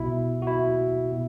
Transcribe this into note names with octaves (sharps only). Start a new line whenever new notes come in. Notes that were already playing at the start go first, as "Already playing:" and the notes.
Already playing: C2 B2 E4
F#4
E4
B2